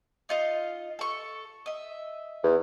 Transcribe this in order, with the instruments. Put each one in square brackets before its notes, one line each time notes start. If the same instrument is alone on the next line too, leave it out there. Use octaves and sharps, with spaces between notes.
[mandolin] D#4 F4 D#5
A4 C#6
D#5 E5
[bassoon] E2